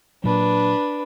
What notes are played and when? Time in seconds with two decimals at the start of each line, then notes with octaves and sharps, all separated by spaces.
0.24 A#2 F#3 D4 B4